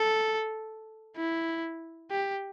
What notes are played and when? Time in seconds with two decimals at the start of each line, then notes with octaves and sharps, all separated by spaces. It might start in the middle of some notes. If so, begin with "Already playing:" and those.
Already playing: A4
1.17 E4
2.11 G4